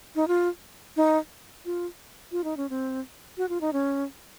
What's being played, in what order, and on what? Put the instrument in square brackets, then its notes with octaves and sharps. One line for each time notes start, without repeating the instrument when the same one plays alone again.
[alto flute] D#4
F4
D#4
F4
F4
D#4
C#4
C4
F#4
F4
D#4
C#4